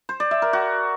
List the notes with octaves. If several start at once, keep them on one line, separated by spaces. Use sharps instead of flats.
C5
D5
E5
A#4
F#4